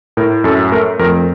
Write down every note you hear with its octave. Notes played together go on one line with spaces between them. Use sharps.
A2 A#4
F#2 A4
A3 A#4
F2 A#4